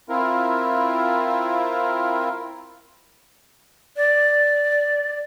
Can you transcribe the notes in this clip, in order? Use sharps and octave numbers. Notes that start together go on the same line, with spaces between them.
C4 E4 F4 A#4
D5